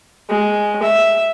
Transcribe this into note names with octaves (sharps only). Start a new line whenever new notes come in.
G#3
E5